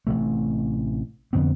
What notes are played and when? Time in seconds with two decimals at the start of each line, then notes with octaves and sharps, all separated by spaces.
0.07 A1 C3 A3
1.33 F2 D3 B3 C4